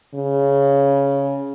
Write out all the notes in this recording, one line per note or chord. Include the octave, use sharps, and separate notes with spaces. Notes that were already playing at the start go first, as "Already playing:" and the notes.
C#3